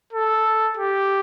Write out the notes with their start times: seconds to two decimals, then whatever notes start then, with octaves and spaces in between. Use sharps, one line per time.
0.13 A4
0.77 G4